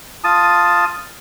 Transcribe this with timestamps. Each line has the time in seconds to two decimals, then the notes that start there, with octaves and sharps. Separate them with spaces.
0.24 F4 A5 D#6